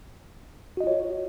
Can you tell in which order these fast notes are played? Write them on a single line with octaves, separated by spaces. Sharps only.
F#4 D#5 F4 C#5